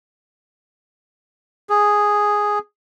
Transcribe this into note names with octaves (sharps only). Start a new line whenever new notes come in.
G#4